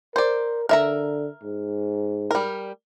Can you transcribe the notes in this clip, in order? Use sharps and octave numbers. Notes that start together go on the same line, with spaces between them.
A#4 C5 D5
D3 A#4 E5 A#5
G#2
G3 A#4